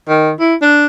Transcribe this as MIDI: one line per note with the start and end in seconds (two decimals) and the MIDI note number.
0.09 0.31 51
0.39 0.54 64
0.62 0.86 62